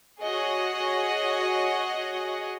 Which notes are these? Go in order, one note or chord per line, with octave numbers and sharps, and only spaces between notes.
F#4 G#4 C#5 D#5 F#5